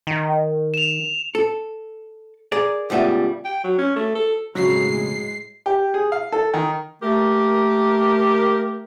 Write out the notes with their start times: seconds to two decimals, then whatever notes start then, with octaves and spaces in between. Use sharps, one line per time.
0.07 D#3
0.74 E7 F7
1.35 A4
2.52 G#4 A#4 D5
2.90 C#2 A2 G3 B3 E5
3.45 G5
3.64 F#3
3.78 C#4
3.96 A3
4.15 A4
4.55 B1 F2 A2 C#3 F#3 G#3 C7
5.66 G4
5.94 G#4
6.12 F5
6.32 A4
6.54 D#3
7.02 A3 A#3 G4 A#4